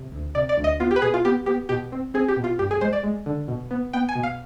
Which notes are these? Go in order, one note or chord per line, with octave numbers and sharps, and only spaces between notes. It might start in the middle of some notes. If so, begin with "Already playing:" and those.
Already playing: C3
D2
C3 D5
D5
D2
D#5
B3 F4
G4
B4
B2 G#4
F4
B3 G4
B3 G4
B2 G4
C4
C4 G#4
G4
B2
F4
G2 G4
G#4
G#3 C5
D5
G#3
D3
B2
B3
B3 G5
G#5
B2
F5